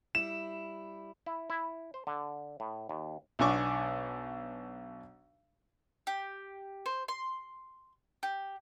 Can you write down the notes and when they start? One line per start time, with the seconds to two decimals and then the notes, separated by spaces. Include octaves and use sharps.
0.15 G3 E4 E7
1.26 E4
1.50 E4
1.94 C5
2.07 D3
2.60 A2
2.89 D#2
3.39 B1 B3 D4 G#5 C#6 D6
6.07 G4
6.86 C5
7.08 C6
8.23 G4